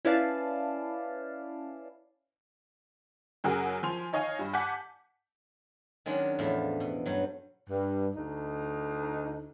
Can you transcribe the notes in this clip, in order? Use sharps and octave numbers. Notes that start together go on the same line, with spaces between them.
C#4 E4 B4 D5 F5 A5
F#2 C#3 F#3 F#4 G#4 A#4
F3 G#5 C6 F7
D#4 C#5 D#5 F5 G#5
G2
F#5 G#5 A5 D6 G6 B6
D#3 F#3 G#3 C#4 D4
E2 A2 F3
B2
G2 F#3
G2
D2 D#4